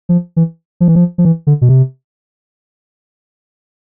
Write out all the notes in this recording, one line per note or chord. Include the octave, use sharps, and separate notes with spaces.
F3
E3
F3
E3
F3
F3
E3
D3
B2
C3